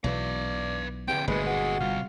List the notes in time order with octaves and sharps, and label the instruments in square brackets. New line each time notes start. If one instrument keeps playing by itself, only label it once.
[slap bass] B1 B2 E3 [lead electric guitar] B4 F5 [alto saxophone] D5
[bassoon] E2 [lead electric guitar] D3 C4 [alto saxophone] G5
[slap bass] G1 A#2 [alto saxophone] G#3 [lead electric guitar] A3 F#4 [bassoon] B4
[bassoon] F#4 [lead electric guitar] G#4 B4
[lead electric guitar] C3 G3 [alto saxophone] F4